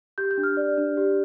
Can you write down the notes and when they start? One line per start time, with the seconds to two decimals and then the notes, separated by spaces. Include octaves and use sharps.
0.18 G4 G6
0.31 G6
0.38 D4
0.43 F6
0.57 D5
0.78 D4
0.97 G4